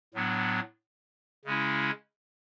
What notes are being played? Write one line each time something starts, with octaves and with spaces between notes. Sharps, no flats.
A2 F#3 B3 D4
C#3 G#3 C#4 E4